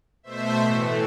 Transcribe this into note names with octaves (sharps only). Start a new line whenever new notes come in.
B2 A3 C5 E5
A2 E3 A3